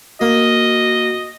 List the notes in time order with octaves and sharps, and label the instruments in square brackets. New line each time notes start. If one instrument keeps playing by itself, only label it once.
[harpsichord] A#3 [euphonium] F#4 [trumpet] D#5